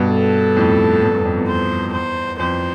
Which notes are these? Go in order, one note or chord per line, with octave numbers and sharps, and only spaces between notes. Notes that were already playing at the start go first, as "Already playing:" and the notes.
Already playing: G2 B2
A4
F2 A2
E2 G2
E2 G2
F2
E2
C5
C5
F2 C5